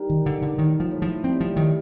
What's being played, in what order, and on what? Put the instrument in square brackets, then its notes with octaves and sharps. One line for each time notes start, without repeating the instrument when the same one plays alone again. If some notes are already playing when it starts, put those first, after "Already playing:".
Already playing: [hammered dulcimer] G3 D#4 A#4
[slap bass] D#3
[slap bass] D3 [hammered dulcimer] D#4
[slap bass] D3
[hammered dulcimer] A2 [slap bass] D#3
[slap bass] F3
[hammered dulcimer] A2
[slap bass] F3
[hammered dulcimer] G3 [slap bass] C4
[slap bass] F3
[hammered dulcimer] A2 [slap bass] D#3